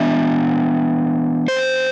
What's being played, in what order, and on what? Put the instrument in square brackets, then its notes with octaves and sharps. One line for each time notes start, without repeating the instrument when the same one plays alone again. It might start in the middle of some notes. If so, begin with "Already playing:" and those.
Already playing: [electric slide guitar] E3 B3 D4 E5
C5